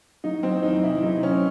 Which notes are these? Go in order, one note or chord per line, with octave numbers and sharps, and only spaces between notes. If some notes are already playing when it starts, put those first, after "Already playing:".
F#3 D#4
F#3 C4
E2 D#4
C3 E4
F#3 D#4
C3 C#4